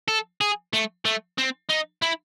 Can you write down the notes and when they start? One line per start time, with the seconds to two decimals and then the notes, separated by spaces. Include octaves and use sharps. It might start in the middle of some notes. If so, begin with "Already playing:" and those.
0.08 A4
0.41 G#4
0.73 A3
1.05 A3
1.38 C4
1.70 D#4
2.02 E4